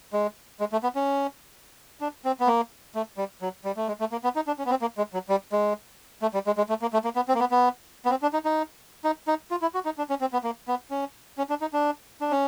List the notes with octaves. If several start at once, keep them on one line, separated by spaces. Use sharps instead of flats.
G#3
G#3
A3
B3
C#4
D4
C4
B3
A#3
A3
G3
F#3
G3
A3
G#3
A3
A#3
B3
D#4
D4
C#4
B3
C4
A#3
G#3
F#3
G3
G#3
A3
G3
G#3
G#3
A3
A#3
A3
A#3
B3
C4
A#3
B3
B3
B3
C4
D4
D#4
D#4
D#4
D#4
F4
E4
F#4
D#4
D4
C#4
C4
B3
A#3
B3
C#4
C#4
D4
D#4
D4
D4
C#4